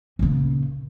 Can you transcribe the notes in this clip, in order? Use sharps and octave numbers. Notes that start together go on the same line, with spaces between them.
A#2 C#3